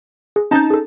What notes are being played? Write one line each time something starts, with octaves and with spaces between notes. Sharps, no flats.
G#4
C4 C#4 D#4 A5 G6
G#4 A4